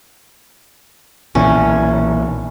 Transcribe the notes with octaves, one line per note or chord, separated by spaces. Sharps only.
B1 A#2 E3 C#4